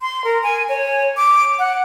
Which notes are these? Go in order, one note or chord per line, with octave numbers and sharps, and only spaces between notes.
C6
A#4
G#5
C#5
D6
F#5